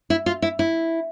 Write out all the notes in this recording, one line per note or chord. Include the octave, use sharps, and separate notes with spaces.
E4
F4
E4
E4